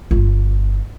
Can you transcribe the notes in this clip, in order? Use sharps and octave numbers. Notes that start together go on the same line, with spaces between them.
G1 F4